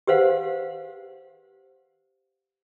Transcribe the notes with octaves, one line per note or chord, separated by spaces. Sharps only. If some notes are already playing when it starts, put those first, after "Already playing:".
G4 B4 C5 F5 F#5